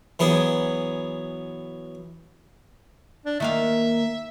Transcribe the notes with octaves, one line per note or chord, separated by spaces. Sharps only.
E3 F#3 B3 G#4
D4
D#3 A#3 E5 F5